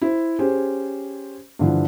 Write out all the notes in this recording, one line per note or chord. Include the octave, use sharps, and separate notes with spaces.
E4 C5
C#4 G4 G#4 C5
G2 D3 E3 F3